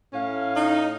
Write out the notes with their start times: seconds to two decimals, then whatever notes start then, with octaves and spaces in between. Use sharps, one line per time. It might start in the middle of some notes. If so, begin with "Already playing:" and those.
0.13 A2 C#4 F5
0.55 D#4